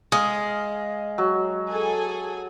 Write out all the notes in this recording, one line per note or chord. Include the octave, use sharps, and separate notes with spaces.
G#3 F5 D#6
F#3
G#4 A4 G#5